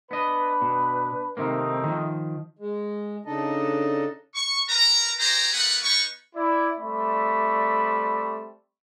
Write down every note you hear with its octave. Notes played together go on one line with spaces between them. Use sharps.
B3 D4 B4 D#5
B2
C3 D#3 A3 A#3 C4 D#4
D#3 F3
G#3
C#3 D4 D#4 A4 D#5
C#6
A#4 B4 A#5
G4 G#4 C5 A#5
A3 A#3 D#4 B4 F#5
B3 D#4 B4 C#6
E4 D5
G3 A3 C4 D5 E5 B5